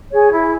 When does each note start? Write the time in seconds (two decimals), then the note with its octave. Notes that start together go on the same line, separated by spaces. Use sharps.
0.11 G#4 C#5
0.30 E4